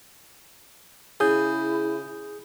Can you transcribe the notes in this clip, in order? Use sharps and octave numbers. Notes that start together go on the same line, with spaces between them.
C#3 E4 G#4 D#6 G6